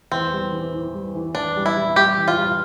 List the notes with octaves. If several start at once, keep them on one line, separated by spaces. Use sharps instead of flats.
E2 C4
G3
E3
E3
G3
E3
E2 D4
G3
E4
G3
G3 G4
E2
F4
G3